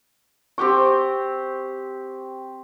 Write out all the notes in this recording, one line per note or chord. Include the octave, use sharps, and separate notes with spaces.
C4 G4 G5 C#6